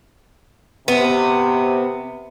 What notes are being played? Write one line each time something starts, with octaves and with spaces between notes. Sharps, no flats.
C3 B3